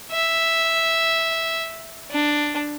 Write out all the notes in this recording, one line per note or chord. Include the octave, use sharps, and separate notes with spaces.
E5
D4